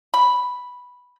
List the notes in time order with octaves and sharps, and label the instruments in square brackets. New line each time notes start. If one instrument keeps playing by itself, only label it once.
[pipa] B5